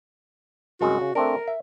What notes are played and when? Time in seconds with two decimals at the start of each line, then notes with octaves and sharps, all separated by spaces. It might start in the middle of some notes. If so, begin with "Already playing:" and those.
0.81 C2 F#2 G#3 F#4
1.01 C#3
1.15 A3 C4 D4 A#4
1.48 E5